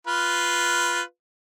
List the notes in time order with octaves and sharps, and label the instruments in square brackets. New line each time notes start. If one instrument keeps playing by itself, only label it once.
[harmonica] F4 B4